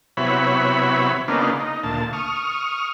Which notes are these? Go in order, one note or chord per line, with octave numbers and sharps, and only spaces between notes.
C3 F#3 B3 E4 C#5 B5
C#3 A#3 B3 D4 D#4 F4
D#4
D2 A#2 A5
C#6 D#6 F6